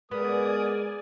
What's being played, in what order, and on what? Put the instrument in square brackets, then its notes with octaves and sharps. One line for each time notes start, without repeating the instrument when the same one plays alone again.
[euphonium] G#3 [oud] B3 [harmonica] A#4 D#6 [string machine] D5 G#5